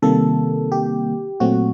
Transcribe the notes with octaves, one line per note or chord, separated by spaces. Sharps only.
C3 D#3 G3 A#3 A4
G4
A#2 F#3 A3 C4 F#4